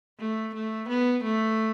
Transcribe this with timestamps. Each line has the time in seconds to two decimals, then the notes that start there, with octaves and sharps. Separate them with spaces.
0.19 A3
0.55 A3
0.89 B3
1.24 A3